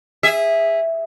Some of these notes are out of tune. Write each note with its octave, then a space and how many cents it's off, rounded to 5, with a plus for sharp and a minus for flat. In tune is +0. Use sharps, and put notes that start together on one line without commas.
G#4 -15 E5 +0